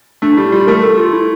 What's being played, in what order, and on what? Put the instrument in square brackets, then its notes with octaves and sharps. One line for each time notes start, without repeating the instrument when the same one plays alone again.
[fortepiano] A3 [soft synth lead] D4
[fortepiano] G3 [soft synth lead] E4
[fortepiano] G3 [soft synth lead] F4
[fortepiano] A3 [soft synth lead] A#4
[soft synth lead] A4
F4
E4